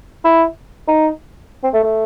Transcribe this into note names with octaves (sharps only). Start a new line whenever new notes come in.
E4
D#4
C4
A3
A3